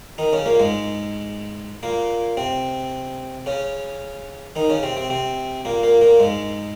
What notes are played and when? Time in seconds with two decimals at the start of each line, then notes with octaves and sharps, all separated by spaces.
0.18 D#3 D#4
0.33 C#3 C#4
0.46 A#2 A#3
0.60 G#2 G#3
1.83 A#2 A#3
2.37 C3 C4
3.46 C#3 C#4
4.56 D#3 D#4
4.69 C#3 C#4
4.83 C3 C4
4.97 C3 C4
5.10 C3 C4
5.65 A#2 A#3
5.83 A#2 A#3
6.01 A#2 A#3
6.20 G#2 G#3